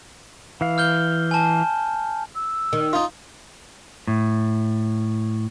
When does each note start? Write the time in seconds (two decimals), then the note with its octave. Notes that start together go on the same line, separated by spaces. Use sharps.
0.61 E3 F5
0.78 F6 G6 G7
1.31 G#5 A5
2.35 E6
2.73 D#3
2.93 D#4 F4
4.07 A2